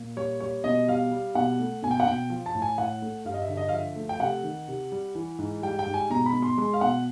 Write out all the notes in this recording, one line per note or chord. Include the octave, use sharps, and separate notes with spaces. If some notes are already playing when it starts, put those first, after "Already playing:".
Already playing: A#2
G3 C#5
G3 C#5
B2 D#5
G3 F5
G3
B2 F#5
A3
B2 G#5
G5
F#5
B2 G5
F3
A5
A2
G#5
A2 F#5
A3
G2 F5
D#5
E5
D3
D#5
F5
F3 E5
A3
G5
C3 F#5
D#3
C3
G3
E3
G#2
G3 G5
G5
G#2
G#5
B2 A#5
B5
B2
C6
G#3 C6
F5
B2 F#5